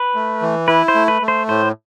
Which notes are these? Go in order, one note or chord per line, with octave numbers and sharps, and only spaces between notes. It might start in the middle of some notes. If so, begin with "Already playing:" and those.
Already playing: B4
A3
E3
E4 B4
C5
A3
B4
A3
C5
A2 C5